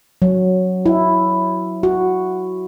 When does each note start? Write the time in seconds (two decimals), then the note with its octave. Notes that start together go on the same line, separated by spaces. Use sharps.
0.22 F#3
0.86 E4
1.83 F#4